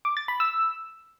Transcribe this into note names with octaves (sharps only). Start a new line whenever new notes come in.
D6
A6
B5
E6